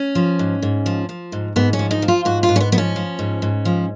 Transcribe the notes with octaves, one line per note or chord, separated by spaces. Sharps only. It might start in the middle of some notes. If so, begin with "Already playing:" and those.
Already playing: C#4
F3
G#2
G#2
F3
F3
G#2
G#2 B3
C#4
F3
D#4
F3
F4
G#2 F#4
F4
G#2
C#4
B3
F3 B3
C#4
F3
G#2
G#2
F3